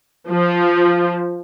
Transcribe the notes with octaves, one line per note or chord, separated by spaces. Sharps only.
F3